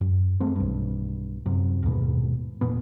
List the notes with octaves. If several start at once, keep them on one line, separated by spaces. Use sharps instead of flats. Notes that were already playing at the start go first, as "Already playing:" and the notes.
F#2
G#3 A3 C4
B1 G2
F#2 C3
D#1 D#2 G#2 B2
E1 F2 A#2 B3